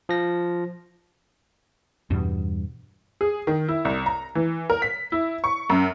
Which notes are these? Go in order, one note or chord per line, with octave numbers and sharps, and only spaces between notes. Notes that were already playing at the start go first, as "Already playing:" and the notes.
F3 A#6
E2 G2 B2 G3
G#4
D#3
E4
C2
A#5
E3
A#4
B6
E4
C#6
F#2